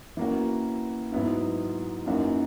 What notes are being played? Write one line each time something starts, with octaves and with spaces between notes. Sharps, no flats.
E3 A#3 C#4 F#4
G#2 F#3 B3 E4
F#2 E3 A#3 D#4 F#4